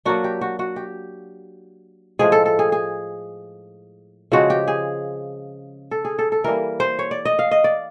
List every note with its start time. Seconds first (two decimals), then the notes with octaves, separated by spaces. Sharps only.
0.05 F#3 A#3 D4 F#4
0.24 G4
0.41 F#4
0.59 F#4
0.76 G4
2.19 A2 F3 G#3 G#4
2.32 A4
2.46 A4
2.59 G#4
2.72 G#4
4.32 C#3 F3 G#3 C4 F#4
4.50 G4
4.68 G#4
5.91 A4
6.05 G#4
6.19 A4
6.32 A4
6.44 E3 G3 A#3 A#4
6.80 C5
6.99 C#5
7.11 D5
7.25 D#5
7.39 F5
7.51 D#5
7.64 D5